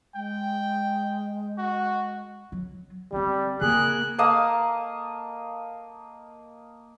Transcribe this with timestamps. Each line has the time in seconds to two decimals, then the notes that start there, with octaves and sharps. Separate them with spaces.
0.15 G#3 G5
1.58 F#4
2.52 F#3
3.12 D2 G3 C4
3.61 C#3 A#3 F4 G#4 F#6
4.18 A#3 D#5 F5 A5